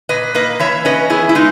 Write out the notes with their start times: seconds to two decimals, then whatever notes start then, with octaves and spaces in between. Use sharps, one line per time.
0.09 A#2 B4 D#5
0.35 A#3 B4 D#5
0.59 E3 C#5 E5
0.85 C#4 B4 D#5
1.10 B3 E4 G#4
1.29 E4
1.35 G#3 D#4